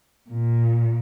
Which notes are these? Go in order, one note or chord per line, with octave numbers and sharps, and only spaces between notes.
A#2